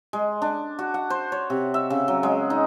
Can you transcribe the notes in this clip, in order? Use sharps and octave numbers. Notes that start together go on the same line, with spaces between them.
G#3
D4
F#4
F#5
C5
C#5
C3
E5
C#3
F#3
G#3
D#4